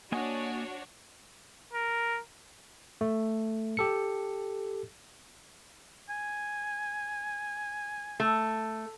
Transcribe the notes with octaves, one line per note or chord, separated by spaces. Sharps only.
A#3 D4 F#4 C#5 D#5 G#5
A#4
A3
G4 A4 C#7
G#5
A3